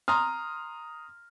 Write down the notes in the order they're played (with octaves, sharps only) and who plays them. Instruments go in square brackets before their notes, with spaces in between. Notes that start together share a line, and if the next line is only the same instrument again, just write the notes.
[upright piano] A#5 C6 D#6 F6